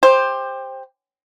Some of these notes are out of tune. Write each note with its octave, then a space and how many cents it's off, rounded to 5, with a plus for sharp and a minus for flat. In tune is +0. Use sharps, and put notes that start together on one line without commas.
G4 +15 C5 +10